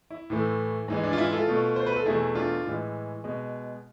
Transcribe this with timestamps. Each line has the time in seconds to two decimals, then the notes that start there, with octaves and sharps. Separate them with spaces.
0.10 E4
0.30 A2 E3 A3
0.88 G#2 E3 G#3
1.03 D4
1.13 F4
1.18 E4
1.32 F4 A4
1.48 B2 A3
1.76 C5
1.86 B4
1.96 A4
2.06 E2 B2 A3 E4 G#4
2.35 D4 F4
2.65 A2 E3 G#3
3.24 B2 G#3